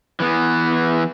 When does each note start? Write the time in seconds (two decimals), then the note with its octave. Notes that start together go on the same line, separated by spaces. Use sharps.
0.20 E3 B3